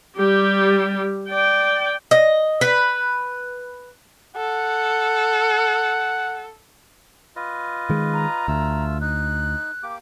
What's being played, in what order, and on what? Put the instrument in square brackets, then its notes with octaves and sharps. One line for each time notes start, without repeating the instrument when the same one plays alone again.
[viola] G3 G4
D5 G5
[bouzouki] D#5
B4
[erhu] A4 [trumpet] F#5
[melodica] F4 B4 D#5
[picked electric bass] D#3 G#3
[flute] A#5
[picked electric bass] D2 [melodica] A3 F4 E6
[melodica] D#4 [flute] F#6
[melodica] A#3 G4 D6